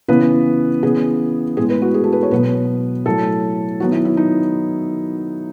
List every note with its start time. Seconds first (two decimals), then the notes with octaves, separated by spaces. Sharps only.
0.08 C#3 E3 B3 B4
0.82 C#3 E3 B3 G#4
1.57 A2 G#3 B3 G#4
1.70 B4
1.82 F#4
1.94 G#4
2.04 A4
2.13 B4
2.23 C#5
2.31 B2 F#3 B3 B4
3.06 A2 F#3 A3 A4
3.80 D#3 F#3 B3 F#4
3.92 E4
4.05 E4
4.17 D#4